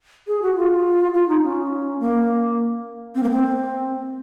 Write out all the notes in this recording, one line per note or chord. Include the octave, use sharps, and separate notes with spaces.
G#4
F#4
F4
F4
D#4
C#4
A#3
C4
A#3
C4